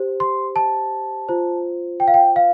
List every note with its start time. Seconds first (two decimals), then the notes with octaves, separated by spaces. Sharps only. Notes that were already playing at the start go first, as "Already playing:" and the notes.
Already playing: G4 C5
0.20 C6
0.56 A5
1.29 F4 C5
2.00 G5
2.08 F5
2.14 G5
2.36 F5